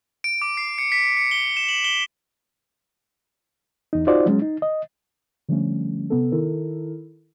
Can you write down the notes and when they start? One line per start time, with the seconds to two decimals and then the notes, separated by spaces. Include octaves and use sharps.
0.24 D7
0.42 D6
0.57 C7
0.78 C#7
0.92 B6
1.17 C#7
1.31 G7
1.57 E7
1.69 F#7
1.84 G7
3.93 E2 D#4
4.07 D#4 F4 F#4 C5 D5
4.26 F#3 G#3 C#4
4.42 D#4
4.62 D#5
5.49 D3 F3 G3 A3 C#4
6.10 C3 B3 A4
6.32 D#3 E4 A4 A#4